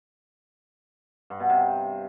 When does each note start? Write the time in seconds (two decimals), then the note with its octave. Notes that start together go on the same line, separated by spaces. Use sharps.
1.30 G2
1.40 B2
1.50 C3